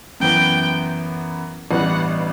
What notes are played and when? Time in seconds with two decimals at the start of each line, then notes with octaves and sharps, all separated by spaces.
0.20 F#2 E3 B3 G5
1.71 A1 G2 E3 G3 B3 F#5